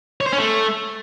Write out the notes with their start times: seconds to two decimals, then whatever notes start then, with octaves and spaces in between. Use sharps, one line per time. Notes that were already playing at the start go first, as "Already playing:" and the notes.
0.21 C#5
0.26 C5
0.32 C#4
0.38 A3